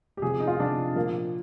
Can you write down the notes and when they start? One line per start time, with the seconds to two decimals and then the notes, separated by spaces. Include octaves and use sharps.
0.17 G4
0.22 C3 F3 G#4
0.40 D#4
0.47 F4
0.59 C3 F3 D4
0.95 A#2 F3 A#3